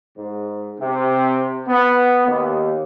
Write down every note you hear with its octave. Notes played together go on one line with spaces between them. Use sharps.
G#2
C3
B3
D#2